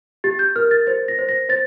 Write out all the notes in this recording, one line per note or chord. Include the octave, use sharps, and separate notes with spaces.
G4 A6
G6
A#4 F6
A6
C5 A6
A#6
C5
A#6
C5 A6